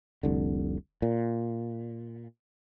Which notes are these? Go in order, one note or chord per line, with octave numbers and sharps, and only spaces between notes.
F1 C2 D3
A#2